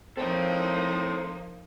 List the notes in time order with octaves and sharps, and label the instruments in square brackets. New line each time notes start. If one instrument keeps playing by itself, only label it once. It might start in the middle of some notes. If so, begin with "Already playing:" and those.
[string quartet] F3 A#3 D#4 [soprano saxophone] C4 [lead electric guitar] A4 C#5 [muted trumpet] C5